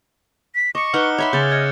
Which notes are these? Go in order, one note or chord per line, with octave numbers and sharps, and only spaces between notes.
B6
D#5 C#6 D6 C#7
D#4 B4 F#5 F6 F#6 G7
C#5 E5 B5 C6
C#3 C#4 G6 A6
D#5 F6 G#6 C#7